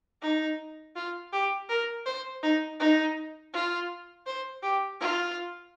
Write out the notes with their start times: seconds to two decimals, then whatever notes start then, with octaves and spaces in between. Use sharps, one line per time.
0.22 D#4
0.96 F4
1.33 G4
1.69 A#4
2.06 C5
2.43 D#4
2.80 D#4
3.53 F4
4.26 C5
4.63 G4
5.00 F4